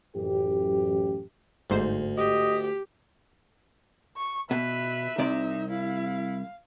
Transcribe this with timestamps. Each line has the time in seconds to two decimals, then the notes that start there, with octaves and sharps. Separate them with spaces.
0.16 A1 F#2 G4
1.70 G1 D2 G#2 C5
2.17 G4 D#5 D#6
4.17 C#6
4.51 B2 B4 E5
5.18 C2 C3 D#4 D5
5.70 E4 F5